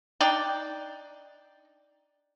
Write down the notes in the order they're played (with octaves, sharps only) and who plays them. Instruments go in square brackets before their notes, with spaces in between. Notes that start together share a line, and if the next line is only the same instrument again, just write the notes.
[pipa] D4 D#4 D5 G5